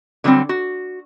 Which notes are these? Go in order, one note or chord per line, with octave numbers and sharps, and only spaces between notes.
D3 F#3 G3 B3 C4
F#4